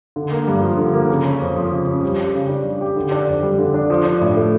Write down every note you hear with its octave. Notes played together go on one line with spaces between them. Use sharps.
D3
A#3
G2
F3
D3
A#3
C#3
C#4
F2
F3
C#3
C#4
G3
G4
C#3
D4
G3
G4
D3
D4
F2
G3
D3
D4
F3
D4
A2
A3